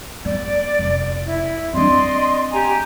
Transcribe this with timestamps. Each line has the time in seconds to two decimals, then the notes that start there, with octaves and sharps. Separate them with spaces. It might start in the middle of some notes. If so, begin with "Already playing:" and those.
0.25 B3 D5
0.79 F1
1.26 E4
1.73 C4 D4 D5 D#5 C6
2.52 G4 G#5 A#5